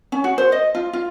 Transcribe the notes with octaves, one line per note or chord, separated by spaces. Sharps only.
C#4
F#4
C5
D#5
F4
F4